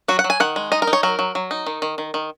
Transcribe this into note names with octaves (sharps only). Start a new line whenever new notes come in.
F#3 F#4
F#5
F#3
G#5
D#3 F#5
G#3
D#4 D#5
A#4
D#4
C#5
F#3 A#4
F#3
F#3
D#4
D#3
D#3
D#3
D#3